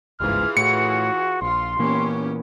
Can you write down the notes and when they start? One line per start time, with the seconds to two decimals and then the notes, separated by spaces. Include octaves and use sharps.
0.20 G1 C#2 G#2 E3 F4 G#4 F6
0.57 A2 F#4 C#7
1.42 A#1 F4 C6
1.79 A#2 E3 A#3 B3 C#4 G4